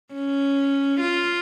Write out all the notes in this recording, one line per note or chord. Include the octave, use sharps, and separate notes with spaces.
C#4
F4